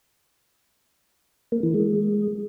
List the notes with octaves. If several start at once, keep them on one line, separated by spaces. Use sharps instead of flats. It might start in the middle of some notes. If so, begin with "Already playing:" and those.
A#3
E3
G#3